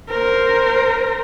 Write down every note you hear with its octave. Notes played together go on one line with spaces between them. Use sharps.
A#4 C5